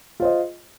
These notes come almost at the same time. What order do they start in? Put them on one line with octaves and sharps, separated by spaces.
F4 C5 D#5